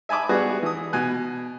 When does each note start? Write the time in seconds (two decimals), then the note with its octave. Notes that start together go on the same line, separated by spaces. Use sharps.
0.09 E5 G#5 A5 B5 D6
0.29 G3 B3 D4 F#4 G#4 B4
0.63 E3 D#6
0.93 B2 G#5 F#6